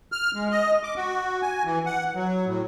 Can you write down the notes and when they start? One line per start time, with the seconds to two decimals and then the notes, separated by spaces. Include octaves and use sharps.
0.12 F6
0.35 G#3
0.51 D#5
0.83 D6
0.96 F#4
1.42 G#5
1.64 E3
1.86 F#5
2.15 F#3
2.46 A2